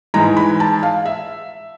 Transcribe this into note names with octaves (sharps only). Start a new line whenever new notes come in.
G#2 E3 G#3 A#5
B5
A5
F5
E5